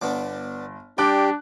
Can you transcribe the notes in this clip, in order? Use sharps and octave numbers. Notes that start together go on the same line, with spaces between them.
G1 B3 D4 D6
G3 D4 G4 G5 D6 F#6